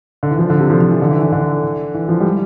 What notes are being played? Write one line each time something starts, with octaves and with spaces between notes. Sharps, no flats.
D3
E3
F3
D3
C3
F3
F3
E3
D3
E3
E3
D3
E3
F3
G3